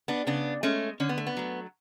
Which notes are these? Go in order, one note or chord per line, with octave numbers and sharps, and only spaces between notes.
B3 D4
C#3 B3 D4
G#3 A3 C#4
D3 C#4
B3
A3
B3
F#3 A3